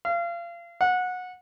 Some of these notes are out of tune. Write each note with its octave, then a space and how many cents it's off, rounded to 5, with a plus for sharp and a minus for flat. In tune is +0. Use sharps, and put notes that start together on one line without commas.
F5 -30
F#5 -20